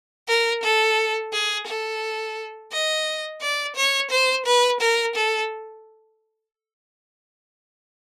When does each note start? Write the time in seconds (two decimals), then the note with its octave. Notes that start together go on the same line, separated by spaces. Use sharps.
0.28 A#4
0.63 A4
1.33 G#4
1.67 A4
2.72 D#5
3.42 D5
3.76 C#5
4.11 C5
4.46 B4
4.81 A#4
5.15 A4